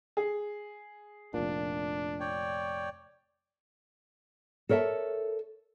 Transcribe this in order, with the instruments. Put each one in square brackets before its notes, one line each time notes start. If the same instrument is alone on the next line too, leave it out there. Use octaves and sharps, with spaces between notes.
[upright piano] G#4
[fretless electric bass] F1 A#2 [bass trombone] D4
[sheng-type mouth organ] C#5 D5 G5
[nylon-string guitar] A4 A#4 C#5 E5 A5